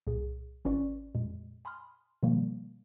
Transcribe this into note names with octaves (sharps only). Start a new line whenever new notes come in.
C2 A#2 G#4
G#1 C#4 F4 B4 D5 C#6
F2 A#2 G#3
G#5 B5 C6 D#6 F6
B2 D#3 F3 G3 A#3